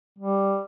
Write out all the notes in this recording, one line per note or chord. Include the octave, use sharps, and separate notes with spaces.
G3